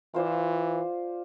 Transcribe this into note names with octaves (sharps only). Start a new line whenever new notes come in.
E3 F4 C5 D5